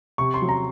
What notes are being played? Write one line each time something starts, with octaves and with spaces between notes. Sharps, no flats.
C3 C#6
C6
F#3
A#5